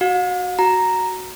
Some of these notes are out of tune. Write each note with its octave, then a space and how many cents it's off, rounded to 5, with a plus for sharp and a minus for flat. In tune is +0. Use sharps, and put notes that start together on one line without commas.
F#4 +0 F5 +45
F#4 +0 A#5 +0